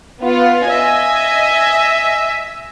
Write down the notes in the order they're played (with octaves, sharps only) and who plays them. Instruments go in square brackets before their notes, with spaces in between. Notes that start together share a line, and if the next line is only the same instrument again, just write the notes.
[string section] B3 F4
[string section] D#5 G#5 [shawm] E5